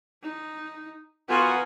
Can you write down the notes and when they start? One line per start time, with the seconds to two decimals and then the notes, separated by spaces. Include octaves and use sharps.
0.23 D#4
1.29 B3 F4 F#4 A#4 G#5